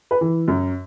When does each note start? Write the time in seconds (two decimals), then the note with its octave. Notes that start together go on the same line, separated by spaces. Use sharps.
0.11 B4
0.21 E3
0.48 F#2